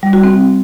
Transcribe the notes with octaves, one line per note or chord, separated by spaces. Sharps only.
G3
F#4
C4